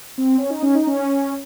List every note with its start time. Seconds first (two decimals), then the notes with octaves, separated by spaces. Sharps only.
0.18 C4
0.38 C#4
0.50 D#4
0.62 C#4
0.75 D#4
0.87 C#4